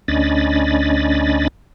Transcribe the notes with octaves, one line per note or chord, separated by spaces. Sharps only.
D2 C#4 D4 D#5 B5 A6